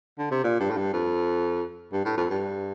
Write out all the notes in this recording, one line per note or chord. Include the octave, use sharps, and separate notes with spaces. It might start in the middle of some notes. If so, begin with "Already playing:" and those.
D3
C3
A#2
G2
A2
G2
F2
G2
A2
F2
G2